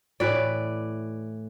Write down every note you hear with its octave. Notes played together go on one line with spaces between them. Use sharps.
A2 E3 B4 D5